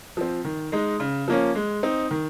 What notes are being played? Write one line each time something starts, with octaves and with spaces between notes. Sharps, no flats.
F3 C4
D#3
G#3 D#4
C#3
F3 A#3 C#4
G#3
C4 D#4
D#3